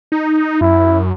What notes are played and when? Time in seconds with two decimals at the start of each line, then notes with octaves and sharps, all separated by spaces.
0.12 D#4
0.61 F#2 E4